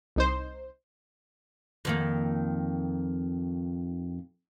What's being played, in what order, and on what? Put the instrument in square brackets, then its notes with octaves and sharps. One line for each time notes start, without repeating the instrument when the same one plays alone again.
[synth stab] C2 D#4 C5
[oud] F2 D#3 A#3